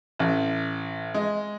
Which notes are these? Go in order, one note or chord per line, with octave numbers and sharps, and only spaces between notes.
A1
G#3